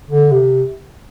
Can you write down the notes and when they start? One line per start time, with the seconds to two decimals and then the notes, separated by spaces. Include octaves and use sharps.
0.10 D3
0.31 C3